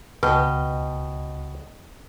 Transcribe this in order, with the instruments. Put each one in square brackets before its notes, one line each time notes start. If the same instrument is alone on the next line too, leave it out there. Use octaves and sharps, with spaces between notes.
[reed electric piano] C#2 [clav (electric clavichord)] B2 [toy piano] B4 [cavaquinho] D#5 G5